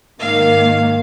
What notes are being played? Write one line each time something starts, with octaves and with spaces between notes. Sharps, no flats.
G#2 D#3 A#3 F5